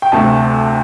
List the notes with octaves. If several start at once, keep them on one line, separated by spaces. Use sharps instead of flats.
G5
D2 C3 A3 A5